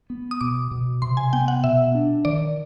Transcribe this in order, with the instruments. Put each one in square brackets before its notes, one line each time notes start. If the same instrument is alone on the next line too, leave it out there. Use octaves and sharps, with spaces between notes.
[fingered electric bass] B3
[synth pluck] D#6
[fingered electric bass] B2 [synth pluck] D6
[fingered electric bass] B2
[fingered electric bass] C3 [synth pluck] C6
[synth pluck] G#5
[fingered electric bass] B3 [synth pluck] G5
[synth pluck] F#5
[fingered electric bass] B2 [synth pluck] E5
[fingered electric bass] D4
[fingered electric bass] D#3 [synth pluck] D5